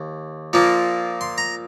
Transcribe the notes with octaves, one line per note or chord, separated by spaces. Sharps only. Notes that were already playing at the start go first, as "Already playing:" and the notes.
Already playing: D#2
A#2 F3 A#3
C6
A#5